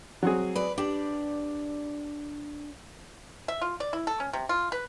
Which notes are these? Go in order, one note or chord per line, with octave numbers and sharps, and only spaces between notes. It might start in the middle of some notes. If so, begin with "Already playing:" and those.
F#3 C4 G#4
B4 D5
D4 G4 D5
E5
F4
D5
E4
A4
C#4
C3
F4
B4